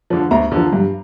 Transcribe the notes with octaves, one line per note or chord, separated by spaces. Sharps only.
D3 F3
D2 A#5
D3 F3
G2